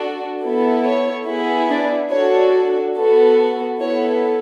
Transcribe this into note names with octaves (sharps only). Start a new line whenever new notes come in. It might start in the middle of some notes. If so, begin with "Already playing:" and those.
Already playing: D4 F#4 A4
B3 E4 A4
C#5
B3 E4 G#4
D4 D5
D4 F#4 A4 C#5
B3 F#4 A4
B3 E4 A4 C#5